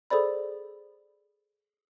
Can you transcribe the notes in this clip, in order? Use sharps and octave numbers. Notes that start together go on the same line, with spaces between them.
G#4 A4 C5 D5 B5